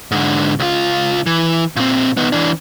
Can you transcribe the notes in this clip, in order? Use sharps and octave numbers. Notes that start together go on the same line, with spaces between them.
G#2 D3
C#2 F4
E3
A#2 C4
D#3 B3
E3 D4